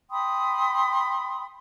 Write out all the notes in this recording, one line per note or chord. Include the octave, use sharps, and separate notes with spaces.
G5 B5 C6 D#6